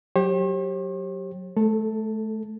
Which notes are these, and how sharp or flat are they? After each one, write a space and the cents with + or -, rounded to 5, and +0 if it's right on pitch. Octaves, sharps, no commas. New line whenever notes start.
F#3 +0 G4 +0 C5 +45
A3 -25 A4 +10